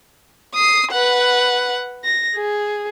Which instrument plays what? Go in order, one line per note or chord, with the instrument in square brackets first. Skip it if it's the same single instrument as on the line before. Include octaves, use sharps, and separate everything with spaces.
[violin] D#6 C7
B4 F#5
A#6
G#4